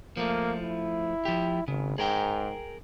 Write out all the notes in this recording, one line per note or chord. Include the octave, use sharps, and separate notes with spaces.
F3 A3 A#3
E4
F3 G4
G#1 C#3
G#2 G#4 A#4 G5